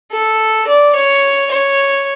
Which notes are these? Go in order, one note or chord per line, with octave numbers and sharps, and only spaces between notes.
A4
D5
C#5
C#5